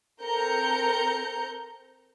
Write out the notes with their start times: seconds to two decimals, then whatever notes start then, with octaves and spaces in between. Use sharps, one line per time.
0.22 C4 A4 A#4 A#5 G6 C#7